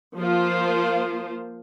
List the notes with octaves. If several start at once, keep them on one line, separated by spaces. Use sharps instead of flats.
F3 A#3 F4 C5